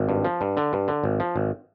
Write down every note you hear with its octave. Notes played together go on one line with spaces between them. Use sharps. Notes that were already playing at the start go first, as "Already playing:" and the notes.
Already playing: G#1
G2
F3
G2
D3
G2
D3
G#1
F3
G#1